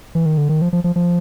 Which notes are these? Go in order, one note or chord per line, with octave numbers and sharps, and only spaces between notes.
E3
D#3
D3
D#3
F3
F3
F3
F3